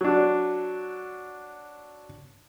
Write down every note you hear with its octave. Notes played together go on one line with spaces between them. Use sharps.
F#3 D4